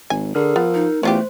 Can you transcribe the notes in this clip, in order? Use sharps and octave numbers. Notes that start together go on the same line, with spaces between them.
G#1 G#5
D3 G#4 A#4 F6
F3 B3
D#4
E2 A3 C#4 F4 G4 C5